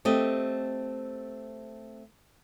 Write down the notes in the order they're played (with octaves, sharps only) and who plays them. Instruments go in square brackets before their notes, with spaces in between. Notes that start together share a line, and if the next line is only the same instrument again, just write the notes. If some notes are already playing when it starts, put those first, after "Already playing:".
[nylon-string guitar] A3 C4 G4 D#5